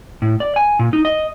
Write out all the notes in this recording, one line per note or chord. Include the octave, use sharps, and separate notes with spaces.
A2
D5
G#5
A#2
D#4
D#5